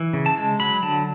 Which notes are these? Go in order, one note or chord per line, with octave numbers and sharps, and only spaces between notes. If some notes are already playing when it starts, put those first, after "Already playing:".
Already playing: E3
C#3
A5
G#3
F#3 B5
D3 A5